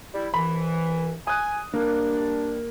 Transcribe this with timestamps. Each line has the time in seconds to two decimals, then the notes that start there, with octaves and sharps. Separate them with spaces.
0.14 G3 E4
0.34 C2 E3 B5
1.27 G#5 D#6 F#6
1.74 G3 A#3 D4